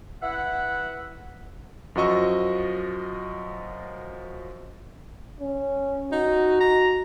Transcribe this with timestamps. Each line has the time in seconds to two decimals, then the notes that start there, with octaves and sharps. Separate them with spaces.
0.22 E4 B4 E5 F#5
1.95 F#2 F3 F#4 D#5 C#6 E6
5.40 C#4
6.12 D#4 F#4
6.61 A#5